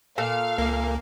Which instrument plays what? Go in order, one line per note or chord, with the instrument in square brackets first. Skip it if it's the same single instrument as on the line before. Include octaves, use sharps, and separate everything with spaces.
[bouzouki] A#2 A4 [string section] F5
[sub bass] C#2 [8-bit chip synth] A#3